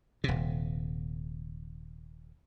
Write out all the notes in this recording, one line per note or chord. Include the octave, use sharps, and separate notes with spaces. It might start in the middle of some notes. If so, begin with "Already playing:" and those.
D#1 C3